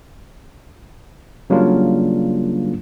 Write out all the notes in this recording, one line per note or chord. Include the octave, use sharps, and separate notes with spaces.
C#3 F#3 G3 A#3 D4 F4